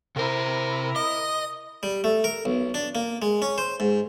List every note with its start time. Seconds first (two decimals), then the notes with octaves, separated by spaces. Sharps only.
0.16 C3 E4 A#4 C5
0.96 D#5 D#6
1.83 G3
2.04 A3
2.24 A#4
2.45 B1
2.74 D4
2.95 A#3
3.22 G#3
3.42 C#4
3.58 C5
3.80 G#2